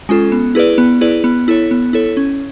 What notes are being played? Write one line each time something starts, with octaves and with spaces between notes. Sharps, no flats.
G#3 C#4 F4 A4
B3
E4 G#4 B4 D5
B3
E4 G#4 B4 D5
B3
E4 A4 C#5
B3
E4 A4 C#5
C#4